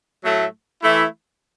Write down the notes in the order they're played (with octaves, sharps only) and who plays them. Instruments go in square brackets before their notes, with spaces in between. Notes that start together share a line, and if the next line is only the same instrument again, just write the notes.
[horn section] A2 F#3 A3
E3 A3 E4